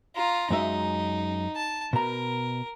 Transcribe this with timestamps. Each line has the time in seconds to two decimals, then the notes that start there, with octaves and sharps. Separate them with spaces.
0.15 F4 A#5
0.50 F#2 G#3 D#4 E5
1.56 A5
1.93 B2 A#4 A#5